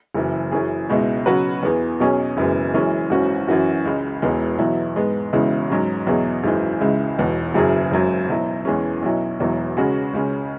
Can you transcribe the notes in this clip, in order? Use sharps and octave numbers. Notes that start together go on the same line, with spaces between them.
F#1 F#2 E3
F#2 E3 C#4 G#4
C#2 B2 G#3 E4
C#3 F#3 B3 F#4 B4
E2 E3 B3 G#4
B1 B2 F#3 C#4 G#4
F#1 F#2 E3 G#3 B3
F#2 E3 G#3 C#4
G#1 F#2 E3 C#4 F#4
F#2 E3 C#4 F#4
C#2 C#3 G#3
E1 E2 E3 G#3 B3
E2 B2 F#3 E4
G#2 G#3 B3
E1 E2 C#3 G#3 E4
G#2 F#3 C#4
E2 B2 F#3 E4 G#4
G#1 F#2 E3 G#3
C#2 C#3 G#3 E4
E1 E2 B2
F#1 F#2 F#3 E4 G#4
G#1 F#2 F#3
B2 F#3 E4
E2 E3 G#3 C#4
B1 B2 F#3 E4
E1 E2 B2 F#3 E4
C#3 G#3 C#4 F#4
C#2 C#3 G#3 C#4